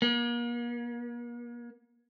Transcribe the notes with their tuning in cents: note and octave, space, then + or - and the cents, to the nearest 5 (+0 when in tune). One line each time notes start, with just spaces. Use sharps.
A#3 +40